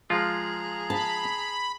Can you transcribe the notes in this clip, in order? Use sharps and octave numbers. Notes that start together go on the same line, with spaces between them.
F3 G#3 F4 G#4 A#5
A5 B5